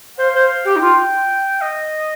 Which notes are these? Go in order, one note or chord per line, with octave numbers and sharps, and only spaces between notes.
C5 F5
C5
G4 G5
D#4
F4
D#5